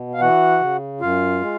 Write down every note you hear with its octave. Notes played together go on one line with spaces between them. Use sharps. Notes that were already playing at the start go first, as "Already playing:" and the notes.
Already playing: B2
F5
E3 F#4 F#5
C#3
F#2 F4 F5
G#3